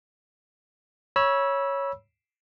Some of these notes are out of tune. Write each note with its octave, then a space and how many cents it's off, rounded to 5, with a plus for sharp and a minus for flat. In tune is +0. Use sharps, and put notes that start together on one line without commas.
C#5 +0 B5 -30 E6 +0